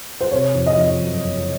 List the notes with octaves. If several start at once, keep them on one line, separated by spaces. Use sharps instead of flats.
C5
C3 C#5
F2
D#5
F2
F#2
F#1